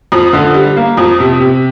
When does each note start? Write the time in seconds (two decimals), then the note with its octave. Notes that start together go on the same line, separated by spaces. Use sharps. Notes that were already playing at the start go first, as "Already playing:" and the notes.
0.12 F2
0.33 D3
0.54 G3
0.77 A#3
0.97 F2
1.20 C3
1.40 C3